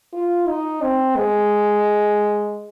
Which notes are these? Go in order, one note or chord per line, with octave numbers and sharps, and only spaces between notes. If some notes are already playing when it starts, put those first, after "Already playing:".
F4
D#4
C4
G#3